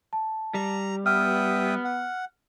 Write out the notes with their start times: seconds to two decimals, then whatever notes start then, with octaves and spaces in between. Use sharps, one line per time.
0.13 A5
0.54 G3 A#5
1.06 B3 E5 G5 D#6 F6
1.85 F#5